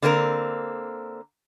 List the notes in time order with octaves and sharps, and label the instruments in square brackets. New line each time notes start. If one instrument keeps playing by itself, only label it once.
[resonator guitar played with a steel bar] D3 A#3 C4 F4 A#4